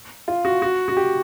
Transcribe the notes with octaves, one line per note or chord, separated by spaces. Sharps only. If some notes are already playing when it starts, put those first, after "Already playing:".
F4
F#4
F#4
F#4
G4